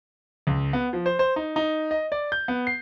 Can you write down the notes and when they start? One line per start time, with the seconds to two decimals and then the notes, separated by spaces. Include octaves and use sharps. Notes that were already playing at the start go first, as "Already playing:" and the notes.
0.47 C#2
0.73 B3
0.93 F3
1.06 C5
1.19 C5
1.36 D#4
1.56 D#4
1.91 D#5
2.12 D5
2.32 G6
2.48 B3
2.67 C7